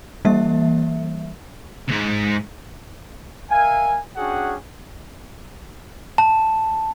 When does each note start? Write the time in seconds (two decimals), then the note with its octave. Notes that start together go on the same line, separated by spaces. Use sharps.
0.25 E3 G3 A#3 E5
1.89 C2 G#2
3.51 A#4 E5 F5 G#5
4.16 C#4 D4 F#4 G#4 F#5 G5
6.18 A5